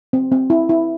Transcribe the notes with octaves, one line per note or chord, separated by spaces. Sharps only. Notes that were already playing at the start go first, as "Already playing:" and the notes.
C4
C4
E4
E4